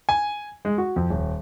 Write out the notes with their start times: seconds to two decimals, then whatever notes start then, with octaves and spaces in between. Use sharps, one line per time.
0.09 G#5
0.65 G#3
0.78 F#4
0.96 F2
1.10 D#1